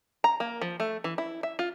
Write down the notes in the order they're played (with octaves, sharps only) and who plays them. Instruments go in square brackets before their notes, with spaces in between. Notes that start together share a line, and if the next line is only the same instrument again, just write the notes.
[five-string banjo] A#5
A#3
F3
A3
E3
E4
E5
F4